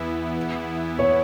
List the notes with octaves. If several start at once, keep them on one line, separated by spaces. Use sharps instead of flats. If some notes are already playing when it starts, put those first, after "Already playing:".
Already playing: E2 E3 B3 E4
C#5